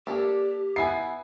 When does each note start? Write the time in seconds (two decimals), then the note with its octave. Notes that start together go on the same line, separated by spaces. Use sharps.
0.07 A#3 D4 G4 A4
0.76 B3 E4 G#5 C7